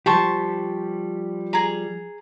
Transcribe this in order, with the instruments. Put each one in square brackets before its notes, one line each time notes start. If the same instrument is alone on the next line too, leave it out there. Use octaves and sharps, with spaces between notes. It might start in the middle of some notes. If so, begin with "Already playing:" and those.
[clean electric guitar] F3 G3 G4 [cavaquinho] C5 A5 C#6
[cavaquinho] G#4 A#5